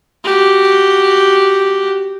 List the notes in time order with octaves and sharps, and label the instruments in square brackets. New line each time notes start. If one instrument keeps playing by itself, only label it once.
[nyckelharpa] F#4 G4